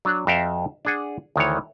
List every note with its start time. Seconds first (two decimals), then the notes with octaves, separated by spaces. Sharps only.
0.05 F#3 D4
0.27 F2 F#4 E5 F5 G5 A5
0.85 D4 G#4 F#5
1.36 D2 D#3 E3 C#5